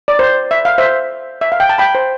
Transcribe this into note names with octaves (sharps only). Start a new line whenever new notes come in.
D5
C5
E5
F5
C5 E5
E5
F5
G5
A5
G5 B5
C5